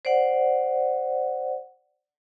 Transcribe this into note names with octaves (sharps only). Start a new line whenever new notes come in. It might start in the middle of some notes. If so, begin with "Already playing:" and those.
C5 D5 F#5